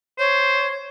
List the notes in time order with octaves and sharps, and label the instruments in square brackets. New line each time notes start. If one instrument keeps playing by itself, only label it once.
[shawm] C5 [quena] C#5